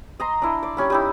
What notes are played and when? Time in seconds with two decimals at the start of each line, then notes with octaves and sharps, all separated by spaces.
0.20 D#5 A#5 C6
0.42 D4 E4
0.63 D5
0.77 G3 C#4 B5
0.90 G3 D#4 E4